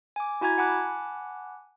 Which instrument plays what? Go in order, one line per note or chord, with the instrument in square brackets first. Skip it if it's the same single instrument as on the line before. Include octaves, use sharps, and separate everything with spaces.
[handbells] G#5 D6
E4 F#4 G#5 A#5 G#6
F#5 G#5 A5 B5 D6 F#6